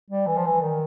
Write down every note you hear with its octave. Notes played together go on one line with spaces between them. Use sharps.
G3
E3
F3
E3
D#3